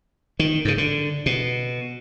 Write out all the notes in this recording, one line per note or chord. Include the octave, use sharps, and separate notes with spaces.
D#3
G#2 C#3
D3
B2